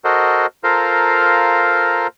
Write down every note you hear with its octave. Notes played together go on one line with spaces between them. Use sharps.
F#4 A4 A#4 C5 D#5 F#5
F4 A4 A#4 C5 F5 A#5